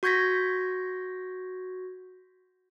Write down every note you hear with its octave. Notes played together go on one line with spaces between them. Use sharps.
F#4 C#6 G6 G#6 A#6 B6